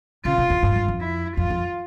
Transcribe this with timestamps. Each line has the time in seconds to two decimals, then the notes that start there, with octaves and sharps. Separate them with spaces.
0.25 C#3 F4
0.38 C3
0.50 E2
0.63 G2
0.76 G2
0.88 F2
1.01 E4
1.37 F2 F4
1.50 F2